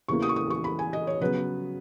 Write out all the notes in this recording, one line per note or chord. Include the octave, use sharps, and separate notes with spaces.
E2 C#3 E3 A#3 C#6
D#6
C#6
D#6
C#6
B5
G#5
D#5
C#5
C#3 F#3 B3 B4